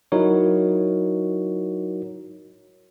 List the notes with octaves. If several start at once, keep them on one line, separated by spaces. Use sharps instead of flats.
F#3 D#4 E4 F#4 A#4 C#5